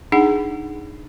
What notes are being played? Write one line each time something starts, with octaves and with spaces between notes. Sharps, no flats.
D4 D#4 G#4 F#5